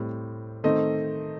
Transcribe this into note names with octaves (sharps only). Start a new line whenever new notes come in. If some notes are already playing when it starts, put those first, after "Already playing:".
Already playing: A2 G3 C4
D#3 A3 C4 D#5